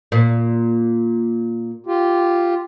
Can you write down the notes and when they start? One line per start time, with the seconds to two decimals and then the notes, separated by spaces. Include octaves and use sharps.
0.12 A#2
1.86 F4 G4